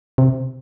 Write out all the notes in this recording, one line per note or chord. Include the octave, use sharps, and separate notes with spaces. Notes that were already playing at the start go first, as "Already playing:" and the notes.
C3